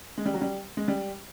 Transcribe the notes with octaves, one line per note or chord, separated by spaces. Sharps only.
G#3
G3
F#3
G3
G#3
G3